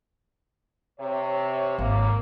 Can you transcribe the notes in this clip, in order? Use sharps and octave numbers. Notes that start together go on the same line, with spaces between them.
C3 C#5
G#1 A#3